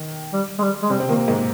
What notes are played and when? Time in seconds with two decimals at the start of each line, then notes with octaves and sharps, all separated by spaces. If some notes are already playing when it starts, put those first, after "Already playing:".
Already playing: D#3
0.33 G3
0.58 G#3
0.62 G3
0.82 G#3
0.90 C3 G3 C4
1.00 C4
1.09 A#2 D#3 A#3
1.27 G#2 D#3 G#3